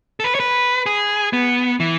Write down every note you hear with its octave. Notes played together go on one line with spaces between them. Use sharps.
A4
B4
C#5
B4
G#4
B3
E3